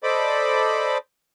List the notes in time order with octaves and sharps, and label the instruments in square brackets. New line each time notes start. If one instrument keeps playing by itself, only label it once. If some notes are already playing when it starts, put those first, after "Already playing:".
[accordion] A4 C5 D5 D#5 B5 D6